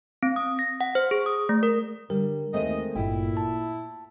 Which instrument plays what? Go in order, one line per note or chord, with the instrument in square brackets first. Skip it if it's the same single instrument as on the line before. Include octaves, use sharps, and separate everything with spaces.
[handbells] C4
D#6
A#6
F#5
C5
G#4
D#6
A3
A#4
[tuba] D3 [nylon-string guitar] G3 [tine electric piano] A#4
[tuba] D#2 [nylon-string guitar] G#3 A3 C4 [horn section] D#5
[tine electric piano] G#1 G2 [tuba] A#2 [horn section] E4 [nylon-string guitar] G5
[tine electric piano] A5